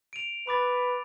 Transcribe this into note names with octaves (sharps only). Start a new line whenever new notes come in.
D7 D#7 F7
B4 B5 D6 A6